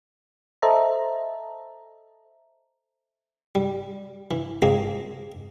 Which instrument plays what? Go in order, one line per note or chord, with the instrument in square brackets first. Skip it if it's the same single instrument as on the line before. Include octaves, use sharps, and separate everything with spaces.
[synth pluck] A4 C5 D#5 E5 A5 A#5
[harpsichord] G3
E3
G#3 A#3 C4 F4 G#4